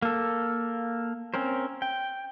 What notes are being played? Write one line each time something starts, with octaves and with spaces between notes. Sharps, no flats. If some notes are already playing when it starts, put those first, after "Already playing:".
A#3 A4
C4 C#4 A#4 C5
G5